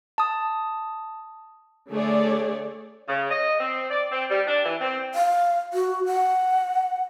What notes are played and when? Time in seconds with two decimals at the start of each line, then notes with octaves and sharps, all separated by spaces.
0.18 A5 D#6
1.91 D3 A3 G#4 A4 C#5 D5
3.08 C#3
3.31 D#5
3.60 C4
3.90 D5
4.12 C4
4.30 G3
4.47 D4
4.65 E3
4.80 C4
5.15 F5
5.73 F#4
6.06 F#5